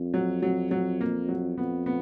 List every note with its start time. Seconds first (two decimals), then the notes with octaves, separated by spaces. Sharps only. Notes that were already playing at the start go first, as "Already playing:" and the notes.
Already playing: F2
0.14 F#3
0.42 F#3
0.71 F#3
1.01 A#3
1.29 F#3
1.58 F2 B3
1.86 B3